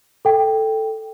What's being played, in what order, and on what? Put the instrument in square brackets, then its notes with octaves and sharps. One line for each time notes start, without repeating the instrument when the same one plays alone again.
[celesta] A4 G5